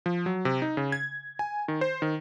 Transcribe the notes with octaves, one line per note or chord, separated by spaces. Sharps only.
F3
F#3
C3
D#4
C#3
G#6
G#5
D#3
C5
D#3